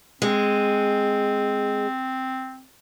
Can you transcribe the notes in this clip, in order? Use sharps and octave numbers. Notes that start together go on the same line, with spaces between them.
G#3 C4